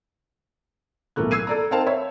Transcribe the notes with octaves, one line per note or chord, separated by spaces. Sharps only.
B1 A2 E3 A3 A#3 F#6
E6 G#6 C7 D#7
A4 D5 A#5
C4 D#4 A#4 C5 F5 A5
C#5 E5